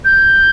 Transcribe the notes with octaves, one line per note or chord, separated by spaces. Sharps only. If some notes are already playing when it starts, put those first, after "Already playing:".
G6